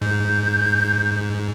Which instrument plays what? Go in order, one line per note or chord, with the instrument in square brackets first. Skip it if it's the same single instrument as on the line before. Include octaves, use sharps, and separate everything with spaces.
[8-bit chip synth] G#2 [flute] G6